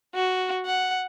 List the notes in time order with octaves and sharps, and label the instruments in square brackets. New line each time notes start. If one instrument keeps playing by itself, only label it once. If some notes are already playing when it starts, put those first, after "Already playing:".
[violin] F#4
F#5